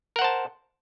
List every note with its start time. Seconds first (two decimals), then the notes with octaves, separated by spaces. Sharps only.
0.16 A#4
0.19 F#5
0.22 C5
0.24 A5